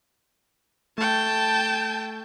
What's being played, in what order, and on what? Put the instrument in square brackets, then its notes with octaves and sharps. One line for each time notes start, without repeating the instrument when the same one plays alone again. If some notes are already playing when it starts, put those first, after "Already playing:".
[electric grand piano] A3 [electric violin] G5 A5